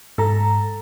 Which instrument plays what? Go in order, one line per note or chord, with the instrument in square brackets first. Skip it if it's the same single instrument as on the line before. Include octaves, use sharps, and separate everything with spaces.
[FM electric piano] G#2 A#5 [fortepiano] A4